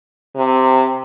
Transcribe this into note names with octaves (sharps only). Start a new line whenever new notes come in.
C3